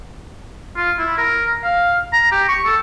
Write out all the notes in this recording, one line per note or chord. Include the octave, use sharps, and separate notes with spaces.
F4
E4
A#4
F5
A#5
G4
C#6
A4